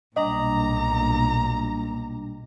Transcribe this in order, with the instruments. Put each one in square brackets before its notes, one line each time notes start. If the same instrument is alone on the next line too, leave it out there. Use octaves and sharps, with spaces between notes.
[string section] B1 A#2 [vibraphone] G3 D4 [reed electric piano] D#5 [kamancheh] A#5